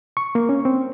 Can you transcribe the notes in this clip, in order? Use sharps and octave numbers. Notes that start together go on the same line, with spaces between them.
C#6
A#3
C#4
C4